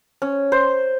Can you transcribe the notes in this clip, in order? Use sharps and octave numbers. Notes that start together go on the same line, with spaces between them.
C#4
C5